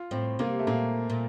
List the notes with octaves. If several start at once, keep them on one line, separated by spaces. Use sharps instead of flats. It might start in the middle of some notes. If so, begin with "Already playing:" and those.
Already playing: F4
A2 C4
C3 A#3
A3
A#2 A#3
A#2